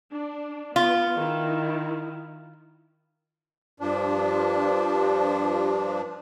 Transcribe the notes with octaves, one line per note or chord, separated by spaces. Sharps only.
D4
B3 F4
D#3 E4
G2 F3 D4